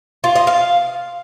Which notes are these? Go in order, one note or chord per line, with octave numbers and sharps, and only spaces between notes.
F4
D#5
F5